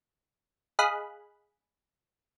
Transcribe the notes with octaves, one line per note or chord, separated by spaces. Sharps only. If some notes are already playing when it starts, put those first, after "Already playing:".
G#4 D#5 F5 B5 F#6